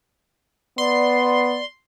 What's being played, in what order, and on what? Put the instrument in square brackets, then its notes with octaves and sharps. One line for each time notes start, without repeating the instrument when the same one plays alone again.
[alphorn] B3 [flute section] D5 [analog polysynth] C6